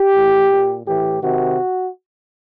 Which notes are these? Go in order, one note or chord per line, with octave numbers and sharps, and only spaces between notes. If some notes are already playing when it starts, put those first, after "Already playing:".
Already playing: G4
A2 E3
A#2
A2 E3 G4
C3 D#3 F#4